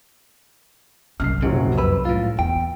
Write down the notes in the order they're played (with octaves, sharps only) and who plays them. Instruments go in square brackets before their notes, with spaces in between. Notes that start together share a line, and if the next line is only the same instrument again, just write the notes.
[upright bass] C2 F#2 [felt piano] F6 C7
[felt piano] D#1 A2 F#3 [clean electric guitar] B1 C#3
[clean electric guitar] F2 B4 [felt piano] E6
[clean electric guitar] A2 F4
[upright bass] E2 [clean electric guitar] G5